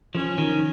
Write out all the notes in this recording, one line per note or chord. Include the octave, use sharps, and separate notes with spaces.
F3 C#4
D#3